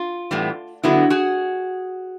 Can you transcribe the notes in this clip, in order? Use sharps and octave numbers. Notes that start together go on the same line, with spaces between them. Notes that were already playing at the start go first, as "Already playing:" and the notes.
Already playing: F4
A2 E3 G3 B3
D3 F#3 B3 E4 F#4
F#4 G#4